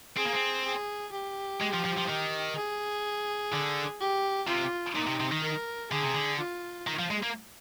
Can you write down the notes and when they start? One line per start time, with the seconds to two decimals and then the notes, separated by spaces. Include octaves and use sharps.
0.17 C4 G#4
0.25 A#3
0.32 C4
0.65 G#4
1.12 G4
1.61 G#3
1.73 F3
1.84 F3
1.97 F3
2.08 D#3
2.56 G#4
3.52 D3
4.00 G4
4.48 C3 F4
4.95 A#2 D#4
5.07 C3
5.20 C3
5.32 D#3
5.44 A#4
5.92 D3 G#4
6.03 C3
6.14 D3
6.39 F4
6.87 D#3
6.99 F3
7.11 G#3
7.23 A#3